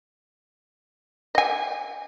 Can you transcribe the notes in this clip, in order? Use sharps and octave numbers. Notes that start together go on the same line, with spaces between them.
D#5 G#5